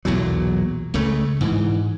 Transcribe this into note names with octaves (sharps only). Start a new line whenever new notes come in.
B1 E2 A#2 F#3
C#2 C#3 A3
G#2 E3